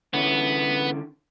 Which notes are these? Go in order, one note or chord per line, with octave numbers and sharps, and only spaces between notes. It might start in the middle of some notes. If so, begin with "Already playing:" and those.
D3 B3 C#4 E4